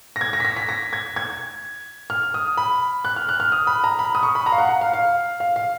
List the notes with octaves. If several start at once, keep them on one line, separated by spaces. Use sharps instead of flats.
A#6
G#6
A#6
B6
A#6
B6
A#6
G#6
G#6
F6
D#6
B5
F#6
F6
F#6
F6
D#6
B5
A#5
B5
D#6
C#6
B5
A#5
F5
F#5
F5
F5
F5
F5
F5